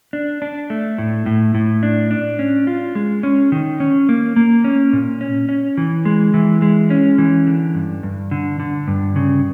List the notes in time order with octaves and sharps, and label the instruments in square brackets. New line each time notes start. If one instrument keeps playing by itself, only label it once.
[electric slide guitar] D4
D4
A3
A2
A2
A2
D4
D4
C#4
F4
G#3
C#4
D#3
C#4
A#3
A#3
C#4
A#2
C#4
C#4
E3
G#3
E3
G#3
C#4
E3
D3
G2
G2
D3
D3
G2
C#3